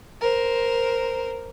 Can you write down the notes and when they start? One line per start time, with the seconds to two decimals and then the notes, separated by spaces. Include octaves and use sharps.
0.21 A#4 C5